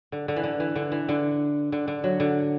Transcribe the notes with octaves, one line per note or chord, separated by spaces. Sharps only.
D3
D3
E3
D3
E3
D3
E3
D3
D3
D3
F#3
D3